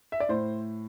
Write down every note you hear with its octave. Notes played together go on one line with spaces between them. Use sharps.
E5
D5
A2 C5